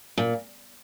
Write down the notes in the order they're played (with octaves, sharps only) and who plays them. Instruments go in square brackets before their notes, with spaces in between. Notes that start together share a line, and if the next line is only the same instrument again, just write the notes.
[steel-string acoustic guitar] A#2